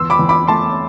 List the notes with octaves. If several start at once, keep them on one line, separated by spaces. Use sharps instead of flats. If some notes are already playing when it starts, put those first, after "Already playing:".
Already playing: E2 C6 E6
B5 D6
E2
B5 D6
A3 A5 C6